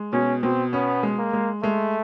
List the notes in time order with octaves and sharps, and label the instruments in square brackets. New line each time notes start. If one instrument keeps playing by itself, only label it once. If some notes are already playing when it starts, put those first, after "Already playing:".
Already playing: [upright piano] G#3
[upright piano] B2 [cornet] C#4
[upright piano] B2 [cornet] C4
[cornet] B3 [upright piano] C#4
[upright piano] G#3
[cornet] A#3
[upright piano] G#3
[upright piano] G#3 [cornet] A3